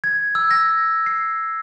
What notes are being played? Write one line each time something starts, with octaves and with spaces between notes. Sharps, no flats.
G#6
E6
A#6
C7